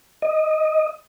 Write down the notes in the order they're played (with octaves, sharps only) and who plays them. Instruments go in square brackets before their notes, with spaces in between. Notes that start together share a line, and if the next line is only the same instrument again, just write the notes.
[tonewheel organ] D#5